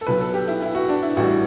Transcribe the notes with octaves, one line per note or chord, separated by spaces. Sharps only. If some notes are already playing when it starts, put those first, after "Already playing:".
A4
B1 B2 F#3 B4
A4
G4
E4
E4
F#4
D4
E4
A1 A2 E3 G3 F#4